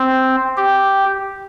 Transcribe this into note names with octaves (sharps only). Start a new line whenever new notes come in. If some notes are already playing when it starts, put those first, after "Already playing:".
Already playing: C4
G4